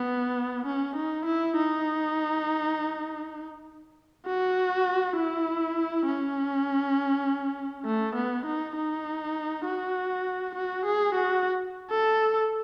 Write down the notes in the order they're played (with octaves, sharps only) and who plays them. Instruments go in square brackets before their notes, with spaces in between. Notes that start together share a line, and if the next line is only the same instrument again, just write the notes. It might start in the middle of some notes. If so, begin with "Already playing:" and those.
Already playing: [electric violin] B3
C#4
D#4
E4
D#4
F#4
E4
C#4
A3
B3
D#4
D#4
F#4
F#4
G#4
F#4
A4